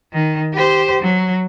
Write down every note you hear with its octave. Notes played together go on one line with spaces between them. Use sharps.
D#3
G4 C5
F#3